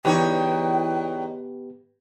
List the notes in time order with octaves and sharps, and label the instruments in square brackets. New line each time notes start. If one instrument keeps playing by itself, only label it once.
[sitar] E2 D#4 C#5 [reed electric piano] B3 G4 B4 [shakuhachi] G5